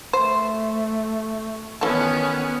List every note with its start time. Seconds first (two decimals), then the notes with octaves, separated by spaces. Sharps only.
0.13 A3 C5
1.81 D#3 E3 B3 C#4 A4